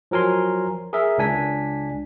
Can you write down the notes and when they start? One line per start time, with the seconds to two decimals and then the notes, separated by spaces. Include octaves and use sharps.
0.11 F3 F#3 A#4 G#5 C6
0.93 G#4 A#4 E5
1.18 C#2 D4 G#5 B6